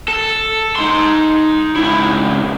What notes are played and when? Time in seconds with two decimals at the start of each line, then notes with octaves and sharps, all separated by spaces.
0.08 A4
0.76 D#4 C6
1.75 C#2 E4